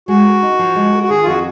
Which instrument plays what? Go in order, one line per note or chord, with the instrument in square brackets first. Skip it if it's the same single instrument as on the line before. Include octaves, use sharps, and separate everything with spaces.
[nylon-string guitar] G#3 [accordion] F#4
[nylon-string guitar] A#4
D#4
F3
G#3
A#4
[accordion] F#4
[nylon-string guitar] D#3 [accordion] G#4
[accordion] F4
[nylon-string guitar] F2 [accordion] F#4